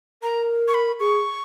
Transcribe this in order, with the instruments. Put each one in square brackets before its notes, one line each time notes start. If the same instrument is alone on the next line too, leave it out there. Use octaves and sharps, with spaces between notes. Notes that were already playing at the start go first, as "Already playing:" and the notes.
[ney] A#4 [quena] A#5
[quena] C#6
B5
[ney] G#4 [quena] C#6